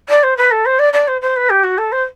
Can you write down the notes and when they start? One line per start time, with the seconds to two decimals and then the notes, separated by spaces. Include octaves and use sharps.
0.09 D5
0.23 C5
0.37 B4
0.51 A4
0.65 C5
0.79 D5
0.93 D5
1.07 C5
1.21 C5
1.36 B4
1.49 G4
1.63 F#4
1.77 A4
1.91 C5